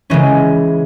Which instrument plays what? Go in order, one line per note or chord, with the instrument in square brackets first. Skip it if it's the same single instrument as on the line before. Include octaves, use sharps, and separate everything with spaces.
[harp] C#3 E3 G#3 C#4